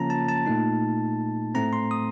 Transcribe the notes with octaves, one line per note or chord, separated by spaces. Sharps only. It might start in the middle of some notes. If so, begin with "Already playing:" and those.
Already playing: C#3 F3 A#3 C#4 F4 A5 A#5
A5
A5
A#2 A3 D#4
A2 A3 C4 A#5
C6
D#6